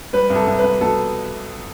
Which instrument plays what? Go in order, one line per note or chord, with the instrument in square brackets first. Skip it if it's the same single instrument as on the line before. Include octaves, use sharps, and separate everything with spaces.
[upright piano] G3 [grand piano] B4
[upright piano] C2
[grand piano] A4
[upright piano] C2
[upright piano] C2 [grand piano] B4
[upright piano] B2 [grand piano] A4